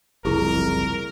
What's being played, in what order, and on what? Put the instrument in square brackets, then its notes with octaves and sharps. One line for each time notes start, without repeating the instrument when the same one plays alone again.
[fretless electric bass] F#1 C2 F2 [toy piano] E4 G4 G#4 [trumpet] A#4